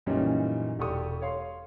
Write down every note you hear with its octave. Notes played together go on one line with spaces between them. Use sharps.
F#2 A#2 E3 G3 C#4 D#4
E1 G4 A4 D5 C#6 D#6
C#5 F5 C6